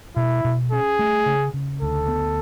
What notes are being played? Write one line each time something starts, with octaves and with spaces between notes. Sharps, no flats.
B2 E4
B2
C#4 G#4
A3
C#3
C#3
D2 A4
B3